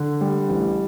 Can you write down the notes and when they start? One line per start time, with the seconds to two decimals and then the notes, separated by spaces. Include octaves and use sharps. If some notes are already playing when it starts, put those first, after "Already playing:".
Already playing: D3
0.21 G3
0.48 A1